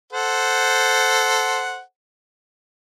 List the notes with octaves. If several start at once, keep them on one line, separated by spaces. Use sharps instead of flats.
A4 C5 F#5